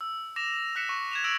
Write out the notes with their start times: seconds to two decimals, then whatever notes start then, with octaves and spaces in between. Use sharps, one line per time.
0.01 E6
0.36 D6 A#6 E7 F7
0.75 E6 F#6 B6 C#7 E7
0.89 C#6
1.11 G#6 E7 F7
1.24 E6 G#6 A#6 D7 F#7